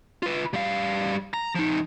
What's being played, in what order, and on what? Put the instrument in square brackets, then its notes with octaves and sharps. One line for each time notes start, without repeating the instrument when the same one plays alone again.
[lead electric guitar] F4 B4
G3 F5
A#5
F3 D#4